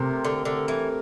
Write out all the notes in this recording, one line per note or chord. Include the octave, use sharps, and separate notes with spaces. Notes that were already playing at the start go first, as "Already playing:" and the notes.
Already playing: C3 A3 C4 G4 A#4
D3
D3
E3